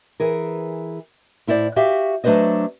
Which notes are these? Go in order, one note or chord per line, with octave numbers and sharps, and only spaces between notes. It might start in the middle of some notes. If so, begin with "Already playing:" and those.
E3 G#4 A#4
A2 E4 C5 D5
F#4 G4 E5 F5
F#3 A3 D4 B4 C5 D#5